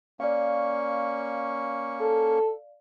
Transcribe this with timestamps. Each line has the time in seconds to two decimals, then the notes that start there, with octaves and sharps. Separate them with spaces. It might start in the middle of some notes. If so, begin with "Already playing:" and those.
0.20 A#3 C#4 D5 F5 C#6
2.01 A4